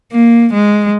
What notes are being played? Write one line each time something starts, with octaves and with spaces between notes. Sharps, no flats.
A#3
G#3